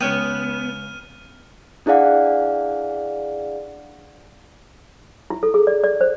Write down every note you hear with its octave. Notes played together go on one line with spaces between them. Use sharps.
C#2 B3 C#4 C#5 G5 D#6 F6 D#7
D4 E4 G#4 D5 F5 F#5
E4
A4
G#4
D5
D5
C5